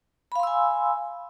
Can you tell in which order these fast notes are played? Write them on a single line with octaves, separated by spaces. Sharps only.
B5 F5 C6 E6 G#5